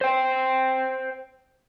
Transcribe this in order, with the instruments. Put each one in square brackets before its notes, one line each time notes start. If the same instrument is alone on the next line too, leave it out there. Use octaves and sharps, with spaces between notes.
[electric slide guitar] C5 G5